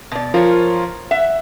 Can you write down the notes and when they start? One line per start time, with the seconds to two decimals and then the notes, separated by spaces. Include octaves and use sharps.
0.11 B2 D5
0.34 F3 F4 A#4 C#5
1.11 E5 F#5